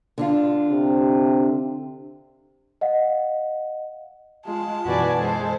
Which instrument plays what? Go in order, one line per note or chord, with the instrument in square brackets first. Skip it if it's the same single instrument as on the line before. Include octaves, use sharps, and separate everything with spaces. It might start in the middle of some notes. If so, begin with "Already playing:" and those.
[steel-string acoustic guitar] D3 D4 F4
[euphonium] C3
[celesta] D#5 F5 F#5
[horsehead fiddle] G#3 F4 [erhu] A5
[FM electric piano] F#2 B2 E3 [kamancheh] F#4 D5 [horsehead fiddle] B4 G#5
[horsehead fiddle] G#3 [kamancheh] A4 C5